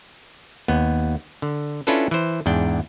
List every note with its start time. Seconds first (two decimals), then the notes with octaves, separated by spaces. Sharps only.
0.68 D#2 B3
1.42 D3
1.87 C#4 D4 E4 F4 A4 B4
2.11 E3 C5
2.46 E2 G#2 D4 G5